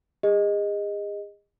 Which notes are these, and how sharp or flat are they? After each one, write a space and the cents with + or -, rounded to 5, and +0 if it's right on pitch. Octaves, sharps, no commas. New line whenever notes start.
G#4 -40 D#5 +0